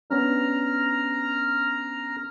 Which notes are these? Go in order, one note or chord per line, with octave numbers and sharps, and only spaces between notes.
B3 C#4 D4 A#5 F6